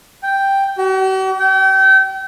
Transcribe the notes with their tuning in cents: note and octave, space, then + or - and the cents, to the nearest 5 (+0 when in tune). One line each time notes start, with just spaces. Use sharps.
G5 +0
F#4 +45
G5 -35